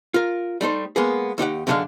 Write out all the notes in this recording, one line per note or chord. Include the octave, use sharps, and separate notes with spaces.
F4 A#4
G3 A3 D#4 C5
G#3 A#3 B3 G#4
D#2 D#4 G4 F#5
F#2 D3 D#3 G#3 D4 F5